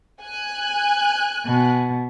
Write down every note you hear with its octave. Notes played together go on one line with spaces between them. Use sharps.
G#5 F#6
B2